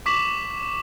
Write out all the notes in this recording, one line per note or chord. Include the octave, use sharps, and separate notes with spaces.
C#6 D6 B6 E7 F#7